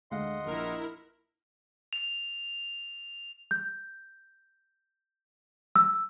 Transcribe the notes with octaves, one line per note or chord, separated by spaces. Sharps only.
D2 G#3 D#5 F5 F#5 C6
A#1 E4 A#4
F7
G6
E6